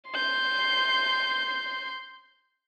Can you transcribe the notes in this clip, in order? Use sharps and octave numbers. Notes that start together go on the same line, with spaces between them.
C6 G6